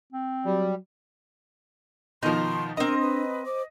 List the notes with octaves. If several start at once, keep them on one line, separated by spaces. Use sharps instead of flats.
C4
F#3 G3
B2 D#3 F3 D#4 A#4 C6
C4 D4 A#4 D#5 A#5
B4
C5 D6